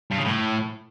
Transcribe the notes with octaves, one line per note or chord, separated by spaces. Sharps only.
G2
C#3
A2